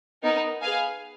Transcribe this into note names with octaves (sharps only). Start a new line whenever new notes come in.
B3 D#4 A#4
G#4 B4 F5 G#5